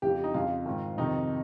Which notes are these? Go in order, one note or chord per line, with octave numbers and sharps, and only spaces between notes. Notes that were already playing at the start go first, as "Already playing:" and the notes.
F2 C#3 G4
D#4
F2 C#3 F4
G#2 D#3
F2 C3 D#3 D#4